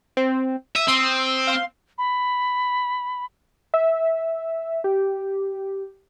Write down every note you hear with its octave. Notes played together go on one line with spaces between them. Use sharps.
C4
E5 D#6
C4 C6 D#6 E6
F5 C6
B5
E5
G4